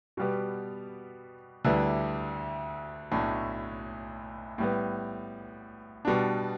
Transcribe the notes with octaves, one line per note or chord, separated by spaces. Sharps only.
B2 G3 B3 G4
D2 D3 G3 E4 B4
B1 A2 A3 D4
A2 G3 B3
B2 G3 B3 D4